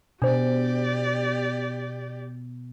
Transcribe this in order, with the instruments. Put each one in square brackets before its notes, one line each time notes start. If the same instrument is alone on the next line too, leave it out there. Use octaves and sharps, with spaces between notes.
[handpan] B2 [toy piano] D4 C5 [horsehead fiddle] G4 D5